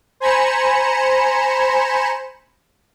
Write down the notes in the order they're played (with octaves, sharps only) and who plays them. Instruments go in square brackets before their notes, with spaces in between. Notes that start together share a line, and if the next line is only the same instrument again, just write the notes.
[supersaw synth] C5 G#5 A#5 B5 C#7 E7